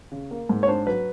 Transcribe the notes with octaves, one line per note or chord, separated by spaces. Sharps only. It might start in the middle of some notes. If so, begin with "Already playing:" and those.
C#3
A#3
G#2
C#5
D4 C5
F#3 B4